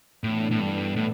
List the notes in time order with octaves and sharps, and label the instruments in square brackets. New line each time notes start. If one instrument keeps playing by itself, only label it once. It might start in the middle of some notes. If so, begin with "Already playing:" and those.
[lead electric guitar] A2 [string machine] E3 B3 D4 A4
[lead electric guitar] A2
G2
A2